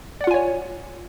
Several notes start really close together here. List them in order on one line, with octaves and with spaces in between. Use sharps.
D5 F#5 F4 G#5 C#5